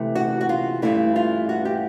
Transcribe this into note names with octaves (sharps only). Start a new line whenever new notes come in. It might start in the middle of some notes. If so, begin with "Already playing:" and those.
Already playing: C3 E3 A3
F#4
F#4
F4
G2 E3 A3 E4
F4
F#4
G4